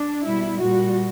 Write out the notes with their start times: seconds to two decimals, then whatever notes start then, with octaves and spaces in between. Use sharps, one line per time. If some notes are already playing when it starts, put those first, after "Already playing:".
Already playing: D4
0.24 B2 G3 E4
0.60 A#2 G3 F#4